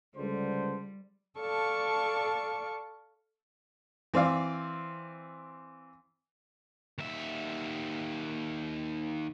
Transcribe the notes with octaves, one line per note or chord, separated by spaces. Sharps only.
C#2 D3 G3 C5
A4 D5 F5 A5 C#6
E3 C4 D5 F5
D#2 E5